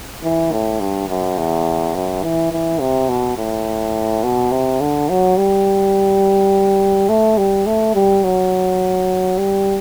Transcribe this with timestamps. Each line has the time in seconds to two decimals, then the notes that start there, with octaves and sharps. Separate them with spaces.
0.24 E3
0.52 A2
0.80 G2
1.09 F#2
1.38 E2
1.95 F#2
2.23 E3
2.52 E3
2.80 C3
3.09 B2
3.38 A2
4.23 B2
4.52 C3
4.81 D3
5.09 F#3
5.37 G3
7.09 A3
7.38 G3
7.66 A3
7.95 G3
8.24 F#3
9.38 G3